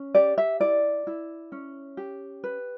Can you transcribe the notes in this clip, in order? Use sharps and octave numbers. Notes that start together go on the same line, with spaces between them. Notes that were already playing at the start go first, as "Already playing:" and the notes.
Already playing: C#4
G4 D5
E5
E4 D5
E4
C#4
G4
B4